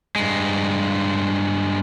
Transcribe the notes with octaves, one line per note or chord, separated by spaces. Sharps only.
G2 G#3